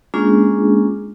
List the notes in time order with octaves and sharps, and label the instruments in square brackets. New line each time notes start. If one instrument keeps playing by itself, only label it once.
[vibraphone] G#3 A#3 C#4 D4 F4 G#4